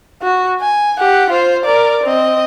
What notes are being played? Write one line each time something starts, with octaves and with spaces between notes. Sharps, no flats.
F#4
G#5
G4 F#5
F4 C5
A#4 D5
C4 D#5